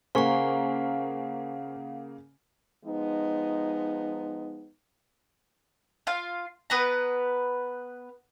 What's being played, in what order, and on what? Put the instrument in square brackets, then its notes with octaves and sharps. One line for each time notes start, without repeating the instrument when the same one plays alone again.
[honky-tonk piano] C#3 A#3 [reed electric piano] C5 G#5 C#6 [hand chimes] F5 F#5
[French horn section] F3 G#3 B3 D#4
[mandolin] F4 F5
B3 B4 A#5